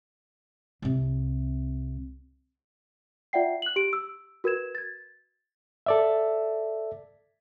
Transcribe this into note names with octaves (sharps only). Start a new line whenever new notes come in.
C2 C3
F4 D5 E5 F#5 G5 C7
F#6 F#7
G4 D7
E6
F#4 A#4 B4 G#6 E7
G#6 A6
A4 D5 E5